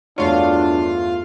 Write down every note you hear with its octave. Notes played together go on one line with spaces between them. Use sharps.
E2 G2 A3 D4 F4 F#4 C#5 F5